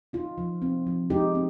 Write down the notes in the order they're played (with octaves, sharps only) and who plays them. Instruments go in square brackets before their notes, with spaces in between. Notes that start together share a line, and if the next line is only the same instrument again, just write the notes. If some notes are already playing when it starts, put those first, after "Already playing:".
[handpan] D#4 F4
F3
C4
F3
G#3 D#4 G4
C4